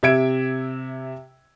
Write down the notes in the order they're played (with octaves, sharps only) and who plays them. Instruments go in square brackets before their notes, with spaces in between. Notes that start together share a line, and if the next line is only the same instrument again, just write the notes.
[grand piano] C3 E5 G#6 D7